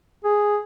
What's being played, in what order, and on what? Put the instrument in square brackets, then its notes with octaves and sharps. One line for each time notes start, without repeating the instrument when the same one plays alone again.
[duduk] G#4